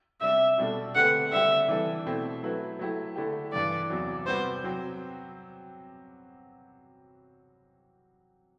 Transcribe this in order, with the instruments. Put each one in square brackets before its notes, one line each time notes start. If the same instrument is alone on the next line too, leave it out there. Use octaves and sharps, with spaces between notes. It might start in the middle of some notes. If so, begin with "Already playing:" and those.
[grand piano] C3 G3 D4 [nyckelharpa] E5
[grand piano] B2 G3 D4 A4
[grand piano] D3 A3 C4 G4 B4 [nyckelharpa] F#5
[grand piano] D3 G3 C4 G4 [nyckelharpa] E5
[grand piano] E3 G3 D4 A4
B2 A3 C4 E4
F#3 A3 E4 B4
F#3 A3 E4 G4
D3 A3 E4 G4
[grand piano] G2 E3 G3 [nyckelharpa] D5
[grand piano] E2 C3 F#3
[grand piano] C3 G3 B3 F#4 B4 [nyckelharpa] C5
[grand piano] F#3 C4